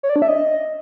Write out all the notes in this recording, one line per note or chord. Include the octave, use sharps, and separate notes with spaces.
C#5
D5
D4
E5
D#5